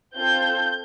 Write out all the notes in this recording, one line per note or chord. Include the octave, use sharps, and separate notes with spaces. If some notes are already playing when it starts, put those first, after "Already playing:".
C4 F4 A4 G6